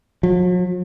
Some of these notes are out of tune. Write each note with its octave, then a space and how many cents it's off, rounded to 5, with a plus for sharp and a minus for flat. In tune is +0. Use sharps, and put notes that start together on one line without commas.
F#3 -45